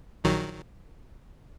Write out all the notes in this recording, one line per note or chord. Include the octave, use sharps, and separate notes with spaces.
A#1 D#3 F#3